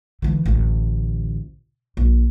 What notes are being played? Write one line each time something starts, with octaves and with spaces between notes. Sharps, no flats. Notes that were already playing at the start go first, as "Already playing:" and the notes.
D3 E3
A1 D2
A#1